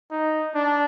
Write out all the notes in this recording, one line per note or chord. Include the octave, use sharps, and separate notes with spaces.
D#4
D4